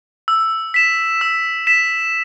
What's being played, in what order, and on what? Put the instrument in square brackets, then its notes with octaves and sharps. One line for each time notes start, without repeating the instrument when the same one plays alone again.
[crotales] E6
B6 E7
E6
B6 E7